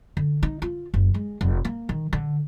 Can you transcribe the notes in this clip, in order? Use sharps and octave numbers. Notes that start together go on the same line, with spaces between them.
D3
D#4
F4
F#1
G#3
F1
A#3
D#3
D3